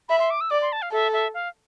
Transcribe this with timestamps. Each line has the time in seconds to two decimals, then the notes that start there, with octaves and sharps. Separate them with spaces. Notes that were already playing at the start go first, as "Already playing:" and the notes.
0.09 E5 B5
0.20 C6
0.30 D6
0.41 E6
0.51 D5 D6
0.62 C6
0.72 A5
0.82 F5
0.92 A4 E5
1.13 E5
1.34 F5